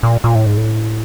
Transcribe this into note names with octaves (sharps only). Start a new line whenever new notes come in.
A#2
A#2
A2
G#2
A2